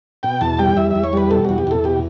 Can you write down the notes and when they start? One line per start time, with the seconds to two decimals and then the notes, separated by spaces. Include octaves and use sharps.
0.23 B2 G5
0.41 E2 A5
0.59 G3 G5
0.77 E2 E5
0.91 E2 E5
1.04 C#5
1.13 G3 B4
1.31 B2 A4
1.45 E2 F#4
1.58 G4
1.67 E2 A4
1.84 B2 G4